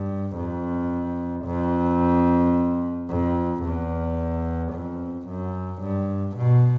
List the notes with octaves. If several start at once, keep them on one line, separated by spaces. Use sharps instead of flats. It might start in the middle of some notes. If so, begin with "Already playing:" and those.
Already playing: G2
F2
F2
F2
E2
F2
F#2
G2
B2